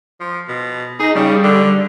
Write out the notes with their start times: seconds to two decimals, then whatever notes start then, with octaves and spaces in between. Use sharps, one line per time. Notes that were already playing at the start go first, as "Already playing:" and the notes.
0.20 F3
0.49 B2
1.00 D#4 G#4
1.15 C#3 G3
1.44 D3